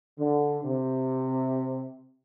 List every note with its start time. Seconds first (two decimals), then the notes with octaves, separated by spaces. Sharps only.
0.19 D3
0.64 C3